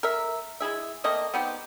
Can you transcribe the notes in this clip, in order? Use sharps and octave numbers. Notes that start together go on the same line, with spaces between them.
A#4 E5
G#3 E4 G#4 E5
A3 A#3 C4 D#5
B3 C4 D#4 G4